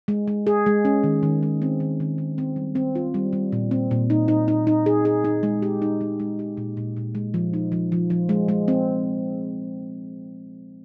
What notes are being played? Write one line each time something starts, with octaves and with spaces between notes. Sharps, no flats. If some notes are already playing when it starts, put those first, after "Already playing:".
G#3
G#3
G#4
G#3
C#4
D#3
D#3
G#3
C4
D#3
D#3
D#3
C4
G3
C4
F4
G3
G3
A#2
C4
A#2
D#4
D#4
D#4
D#4
G#4
G#4
D#4
G#3
G4
D#4
G#3
G#3
G4
A#2
A#2
A#2
G#3
F3
D#4
F3
F3
F3
G#3
G#3
C4